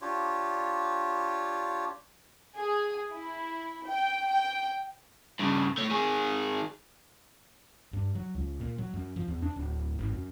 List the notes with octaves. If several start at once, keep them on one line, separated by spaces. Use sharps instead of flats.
D4 F4 G4 C#5
G#4
E4
G5
G5
G2 C#3
A3 C#5
D#3 G#4
G2
F#3
C#2
A#2
F#3
F#2
F3
E2
D4
D1
G#1
F#2